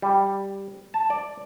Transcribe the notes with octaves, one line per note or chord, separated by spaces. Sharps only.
G3
A5
D5